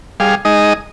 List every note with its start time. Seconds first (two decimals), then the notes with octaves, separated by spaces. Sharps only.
0.20 G3 G#4 F5
0.45 G#3 D#4 D#5